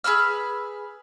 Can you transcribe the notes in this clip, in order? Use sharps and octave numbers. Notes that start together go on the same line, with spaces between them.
G#4 B4 E6 F6